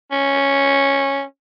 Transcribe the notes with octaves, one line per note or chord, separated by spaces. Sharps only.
C#4